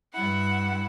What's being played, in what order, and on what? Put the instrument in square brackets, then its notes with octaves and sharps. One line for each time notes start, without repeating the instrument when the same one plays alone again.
[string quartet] G2 E4 F#5